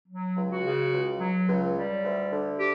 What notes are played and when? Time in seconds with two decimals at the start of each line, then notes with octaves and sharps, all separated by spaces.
0.08 F#3
0.36 C#2
0.50 F#4
0.64 C#3
0.92 C#2
1.20 F#3
1.47 C#2
1.76 G3
2.04 D2
2.32 D3
2.59 G4